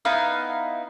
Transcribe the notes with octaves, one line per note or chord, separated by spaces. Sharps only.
B3 D#4 E4 F5